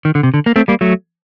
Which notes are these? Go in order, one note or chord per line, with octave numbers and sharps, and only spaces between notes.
D#3
D3
C3
D3
A#3
A3 C4
G3 A#3
F#3 A3